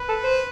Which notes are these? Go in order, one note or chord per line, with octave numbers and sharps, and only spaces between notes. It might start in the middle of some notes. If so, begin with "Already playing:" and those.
Already playing: B4
A4
C5